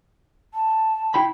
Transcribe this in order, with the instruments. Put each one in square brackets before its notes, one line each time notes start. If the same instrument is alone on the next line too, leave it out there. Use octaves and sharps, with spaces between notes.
[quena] A5
[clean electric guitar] E4 G5 B5